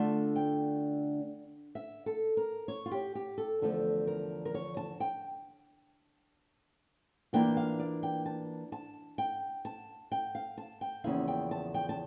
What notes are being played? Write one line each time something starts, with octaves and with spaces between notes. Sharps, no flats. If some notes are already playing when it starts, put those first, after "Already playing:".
Already playing: D3 A3 D4 F4 A5
G5
E5
A4
A#4
C#5
F4
G4
G4
A4
E2 D3 F3 A3 A4
A#4
A#4
C#5
A5
G5
E3 A#3 D4 F4 G5
F5
D5
G5
A5
A5
G5
A5
G5
F5
A5
G5
E2 C#3 F3 A#3 E4 F5
G5
A5
G5
A5